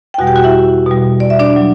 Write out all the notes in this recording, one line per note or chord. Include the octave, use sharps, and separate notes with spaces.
G5
E2 B2 G3 F#4 F#5
G4 G5
F#4 F#5
E4 E5
B2 G3
D5
E5
D4 D5
F#3